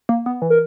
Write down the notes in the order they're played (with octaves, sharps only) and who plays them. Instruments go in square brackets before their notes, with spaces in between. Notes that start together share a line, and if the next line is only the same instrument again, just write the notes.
[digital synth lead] A#3
B3
E3
[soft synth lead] A#4